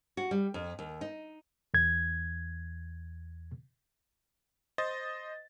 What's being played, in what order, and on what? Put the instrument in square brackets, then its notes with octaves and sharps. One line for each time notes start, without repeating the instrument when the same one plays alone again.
[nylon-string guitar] F#4
G3
F2
D#2
D#4
[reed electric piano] E2 G#6
[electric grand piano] C5 D#5 A6